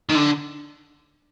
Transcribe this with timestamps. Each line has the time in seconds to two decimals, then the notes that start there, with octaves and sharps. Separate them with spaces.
0.10 D#3
0.15 D3